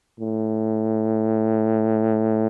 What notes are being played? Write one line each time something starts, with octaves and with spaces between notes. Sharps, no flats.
A2